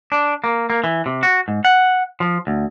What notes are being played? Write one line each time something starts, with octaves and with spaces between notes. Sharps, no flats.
D4
A#3
A#3
E3
C3
F#4
G#2
F#5
F3
D2